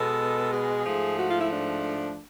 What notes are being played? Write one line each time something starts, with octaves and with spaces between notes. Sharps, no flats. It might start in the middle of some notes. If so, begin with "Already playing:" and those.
Already playing: B2 G#3 B3 A4
G#4
G#2 F3 A3
F#4
F4
E4
D4